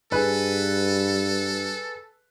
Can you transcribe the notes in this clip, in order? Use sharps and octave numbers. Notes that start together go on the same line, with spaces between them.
G2 G#4 A4 B4